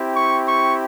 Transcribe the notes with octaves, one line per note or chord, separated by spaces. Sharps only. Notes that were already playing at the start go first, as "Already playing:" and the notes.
Already playing: C4 E4 G4
C#6
C#6